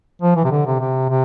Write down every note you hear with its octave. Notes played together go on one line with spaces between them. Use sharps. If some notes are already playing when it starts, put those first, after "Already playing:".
F3
E3
C3
D3
C3
C3
C3